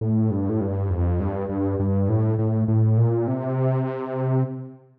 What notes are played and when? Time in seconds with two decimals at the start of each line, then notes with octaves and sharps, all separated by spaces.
0.01 A2
0.31 G2
0.49 A2
0.61 G2
0.90 F2
1.20 G2
1.49 G2
1.79 G2
2.09 A2
2.39 A2
2.68 A2
2.98 A#2
3.27 C3